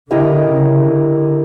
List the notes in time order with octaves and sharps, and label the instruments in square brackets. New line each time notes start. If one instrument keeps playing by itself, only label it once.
[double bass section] D3 [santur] E4 G4 A#4 D#5
[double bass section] C#3
D3